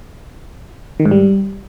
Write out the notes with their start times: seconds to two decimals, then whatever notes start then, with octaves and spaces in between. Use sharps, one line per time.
1.00 D#3
1.05 G#2
1.11 G3